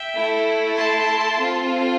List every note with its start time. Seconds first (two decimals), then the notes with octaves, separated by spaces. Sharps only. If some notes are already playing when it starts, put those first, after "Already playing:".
Already playing: E5 G5
0.15 A3 E4 A4
0.77 A5 C6
1.39 C4 F4 A4